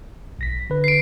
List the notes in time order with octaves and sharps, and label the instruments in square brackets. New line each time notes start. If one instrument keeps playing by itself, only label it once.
[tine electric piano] B1 A#6 B6
D3 B4
[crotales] C7 D7